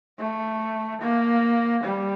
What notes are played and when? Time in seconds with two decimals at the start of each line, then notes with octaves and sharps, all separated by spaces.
0.19 A3
1.01 A#3
1.83 G3